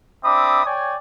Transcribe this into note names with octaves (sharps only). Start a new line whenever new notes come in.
C4 D4 E5 B5 D6 D#6
C#5 D5 G5 G#5